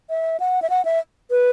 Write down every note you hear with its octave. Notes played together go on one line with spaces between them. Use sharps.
E5
F#5
E5
F#5
E5
B4